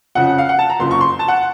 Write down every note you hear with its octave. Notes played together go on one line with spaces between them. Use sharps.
F2 C#3 F3 F#5
F5
F#5
A5
A#5
F#1 F2 C#3 F3 C6
C#6
C6
A5
F#5